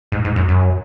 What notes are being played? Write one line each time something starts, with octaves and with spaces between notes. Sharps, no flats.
G#2
G#2
F#2
F#2